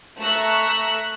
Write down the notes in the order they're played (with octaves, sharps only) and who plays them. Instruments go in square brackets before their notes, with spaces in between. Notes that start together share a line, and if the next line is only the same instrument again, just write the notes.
[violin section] A3 A#5 C#6 E6 F#6 B6